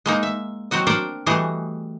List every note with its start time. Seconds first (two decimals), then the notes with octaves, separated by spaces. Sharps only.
0.06 G#3 A#3 D#4
0.23 E5
0.71 F#3 C4 F#4 D#5
0.87 D4 A#4 C5 D5 F#5 G5
1.26 E3 G3 A3 F#4 G#4 D#5